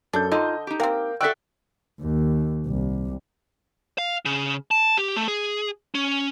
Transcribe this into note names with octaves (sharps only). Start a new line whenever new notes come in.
F#2 D4 A4 G6
D3 D#4 F4 D#5
D#4 G4
A#3 C4 A#4 F5 G5
F#4 A4 D5 E5 G5 E6 F#6 B6
D#2
C2
F5
C#3
A5
G4
A3
G#4
C#4